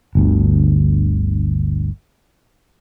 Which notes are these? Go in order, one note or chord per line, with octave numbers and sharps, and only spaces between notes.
G1 D2